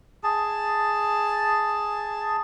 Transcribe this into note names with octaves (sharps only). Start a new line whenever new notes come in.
G#4 A5